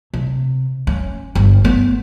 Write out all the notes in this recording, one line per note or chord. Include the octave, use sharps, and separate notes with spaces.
C3
C#4
G1
B3